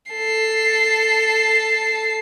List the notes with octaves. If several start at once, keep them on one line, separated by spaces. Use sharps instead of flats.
A4 C7